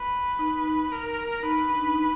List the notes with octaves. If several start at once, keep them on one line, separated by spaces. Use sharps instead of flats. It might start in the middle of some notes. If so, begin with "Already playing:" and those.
Already playing: B4
D#4
A#4
D#4 B4
D4
D#4